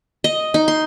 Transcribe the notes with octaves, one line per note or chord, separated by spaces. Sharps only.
D#5
D#4
C6